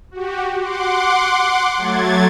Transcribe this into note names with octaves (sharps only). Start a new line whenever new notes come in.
F#4 G4
F#5 C6 D6
F#3 A3 G#6 A6